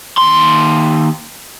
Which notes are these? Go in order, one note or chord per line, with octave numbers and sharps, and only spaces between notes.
D#2 C6